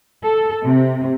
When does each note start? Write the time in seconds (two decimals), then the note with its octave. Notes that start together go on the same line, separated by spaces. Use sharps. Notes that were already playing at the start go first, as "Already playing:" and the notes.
0.23 A4
0.64 C3